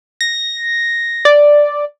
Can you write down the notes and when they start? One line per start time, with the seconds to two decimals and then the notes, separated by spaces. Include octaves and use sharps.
0.21 A#6
1.25 D5